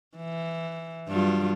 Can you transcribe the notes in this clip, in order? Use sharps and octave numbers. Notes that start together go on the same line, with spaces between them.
E3
G2 F#3 F4